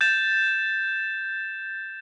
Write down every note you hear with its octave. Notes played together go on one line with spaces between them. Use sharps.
G6 A6 E7